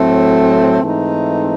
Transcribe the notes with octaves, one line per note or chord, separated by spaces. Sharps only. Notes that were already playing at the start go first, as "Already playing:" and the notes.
Already playing: A2 F#3 A3 C4
G#2 E3 A3 C4 D#4